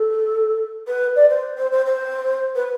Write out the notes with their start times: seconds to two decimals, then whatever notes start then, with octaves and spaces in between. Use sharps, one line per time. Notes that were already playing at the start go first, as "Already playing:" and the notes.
Already playing: A4
0.87 B4
1.16 D5
1.30 C5
1.57 C5
1.72 C5
1.86 C5
2.55 B4